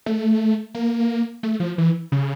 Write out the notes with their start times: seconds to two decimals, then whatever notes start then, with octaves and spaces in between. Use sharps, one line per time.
0.06 A3
0.75 A#3
1.43 A3
1.60 F3
1.78 E3
2.12 C#3